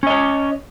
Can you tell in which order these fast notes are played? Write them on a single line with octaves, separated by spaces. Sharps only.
C#4 D#5 C#5